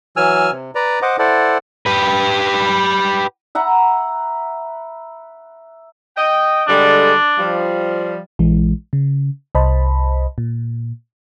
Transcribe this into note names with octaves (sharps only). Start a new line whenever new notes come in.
E3 F#3 G#5 E6 F6
C3
B4 D5 A#5
C5 D#5 F#5 D6
E4 A4 C5 D5 F#5
G4 B4
E5 F#5 A#5 B5
D#5 G5
D3 G3 G#3 D4
F3 G3 F5
A#1 E3 G#3
C#3
C2 C5 D#5 A5 B5
A#2